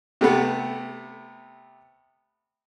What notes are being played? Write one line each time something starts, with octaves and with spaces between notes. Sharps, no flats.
C3 A3 B3